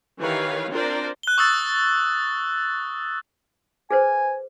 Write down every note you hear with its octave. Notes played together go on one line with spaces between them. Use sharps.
D#3 E3 G4 B4 C#5 F5
C4 D4 F4 A#4 C5 D5
F#6 G7
C#6 D#6 E6 F#6 A6
G#4 B4 C5 G#5